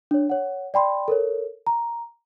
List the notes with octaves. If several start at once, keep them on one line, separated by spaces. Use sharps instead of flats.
D4 C#5
C#5 F#5
D5 G5 B5 C6
A4 A#4 C#5
A#5